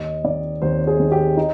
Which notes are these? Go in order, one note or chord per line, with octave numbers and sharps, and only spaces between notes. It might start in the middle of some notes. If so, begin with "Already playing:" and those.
Already playing: D#2 D#5
D#3 D5
D#2 C5
G#4
D#3
G4
D#4